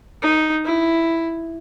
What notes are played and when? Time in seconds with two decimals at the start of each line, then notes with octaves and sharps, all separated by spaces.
0.22 D#4
0.65 E4